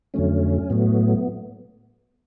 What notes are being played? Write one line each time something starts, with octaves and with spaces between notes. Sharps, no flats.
F2 D3 F#3 A3 C#4
A2 F#3 A3 B3